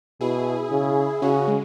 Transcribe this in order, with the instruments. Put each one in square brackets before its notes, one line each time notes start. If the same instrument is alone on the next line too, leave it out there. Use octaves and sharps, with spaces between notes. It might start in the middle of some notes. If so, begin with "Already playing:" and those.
[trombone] B2 [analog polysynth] E4 G#4
[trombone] C#3
[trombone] C#3 [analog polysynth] C#4 F#4
[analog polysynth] G#3